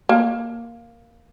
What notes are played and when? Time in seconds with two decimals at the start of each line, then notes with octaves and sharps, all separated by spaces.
0.09 A#3